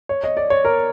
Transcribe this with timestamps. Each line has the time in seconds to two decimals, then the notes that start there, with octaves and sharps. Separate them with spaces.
0.09 C#5
0.24 D#5
0.37 D5
0.50 C#5
0.65 A#4